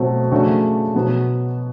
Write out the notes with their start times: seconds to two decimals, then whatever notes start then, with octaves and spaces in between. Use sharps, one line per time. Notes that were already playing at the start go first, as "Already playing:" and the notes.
Already playing: B2 F#3 A3 C4
0.31 C#3 F#3 A3 D4 F#4
0.95 B2 F#3 B3